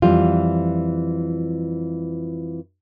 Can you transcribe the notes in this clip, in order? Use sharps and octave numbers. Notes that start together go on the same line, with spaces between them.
F2 E3 G3 F4